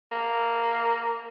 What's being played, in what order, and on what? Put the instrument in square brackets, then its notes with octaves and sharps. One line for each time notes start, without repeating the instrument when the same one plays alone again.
[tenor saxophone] A#3